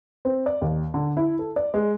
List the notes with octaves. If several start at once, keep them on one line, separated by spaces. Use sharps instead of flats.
C4
D5
D#2
D3
E4
A4
D5
G#3